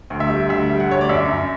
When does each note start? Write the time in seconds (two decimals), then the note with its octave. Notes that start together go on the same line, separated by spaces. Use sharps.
0.10 D2
0.20 E5
0.30 G3
0.49 D2 E5
0.69 G3
0.80 F#5
0.89 D2 C#5
1.01 D5
1.09 F#2 E5
1.28 F#2